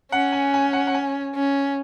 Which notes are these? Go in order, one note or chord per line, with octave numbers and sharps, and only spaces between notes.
C#4 F#5
G#5
G#5
F#5
F#5
G#5
C#4